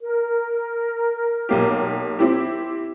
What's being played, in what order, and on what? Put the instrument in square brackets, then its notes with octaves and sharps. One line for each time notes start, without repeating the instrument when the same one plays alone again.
[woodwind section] A#4
[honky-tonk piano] B1 A#3 G4
C4 E4 G4